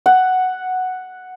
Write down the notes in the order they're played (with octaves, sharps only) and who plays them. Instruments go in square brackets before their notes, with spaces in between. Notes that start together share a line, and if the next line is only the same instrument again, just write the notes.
[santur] F#5